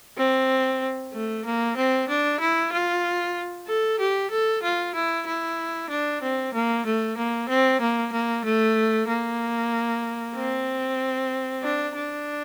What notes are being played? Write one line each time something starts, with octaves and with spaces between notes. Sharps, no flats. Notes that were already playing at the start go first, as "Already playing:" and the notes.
C4
A3
A#3
C4
D4
E4
F4
A4
G4
A4
F4
E4
E4
D4
C4
A#3
A3
A#3
C4
A#3
A#3
A3
A#3
C4
D4
D4